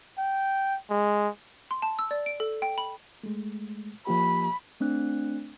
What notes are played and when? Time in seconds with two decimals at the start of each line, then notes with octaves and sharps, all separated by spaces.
0.18 G5
0.90 G#3
1.71 C6
1.82 A5
1.99 E6
2.11 D5
2.26 D7
2.40 A4
2.62 G5
2.78 B5
3.23 G#3 A3
4.07 F3 A#3 G4 B5
4.80 A3 C4 D4 F#6